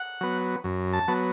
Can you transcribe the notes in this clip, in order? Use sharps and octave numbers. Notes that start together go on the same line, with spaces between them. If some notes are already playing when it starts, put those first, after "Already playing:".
Already playing: F#5
F#3 B3
F#2
A5
F#3 B3